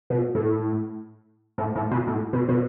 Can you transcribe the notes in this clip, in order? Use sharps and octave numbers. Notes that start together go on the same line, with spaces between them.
B2
A2
A2
A2
B2
A2
B2
B2